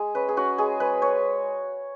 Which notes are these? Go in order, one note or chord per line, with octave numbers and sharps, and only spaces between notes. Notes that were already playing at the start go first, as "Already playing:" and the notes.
Already playing: G#3 G#4
C#4 B4
G#4
C#4 F#4
G#3 G#4
G#3 B4
C#5